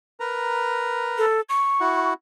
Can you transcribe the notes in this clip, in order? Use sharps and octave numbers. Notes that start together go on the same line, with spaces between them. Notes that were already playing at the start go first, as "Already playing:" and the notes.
A#4 B4 A#5
A4
C#6
E4 F#4 F#5